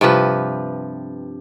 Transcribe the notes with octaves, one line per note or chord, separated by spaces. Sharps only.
G2 C3 F3 B4